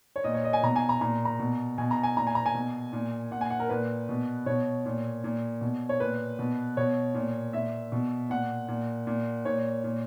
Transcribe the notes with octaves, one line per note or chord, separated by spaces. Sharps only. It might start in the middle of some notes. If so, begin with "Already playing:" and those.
C#5
A#2 D#5
C#5
D#5
G#5
B2 A#5
G#5
A#5
A#2 A#5
A#5
B2
B2 G#5
A#5
G#5
A#2 A#5
G#5
A#5
G#5
B2
A#2
A#2 F#5
G#5
F#5
A#4
A#2 B4
B2
B2 C#5
A#2
A#2
B2
C#5
A#2 B4
B2
B2 C#5
A#2
A#2 E5
B2
A#2 F#5
A#2
A#2
A#2 C#5
A#2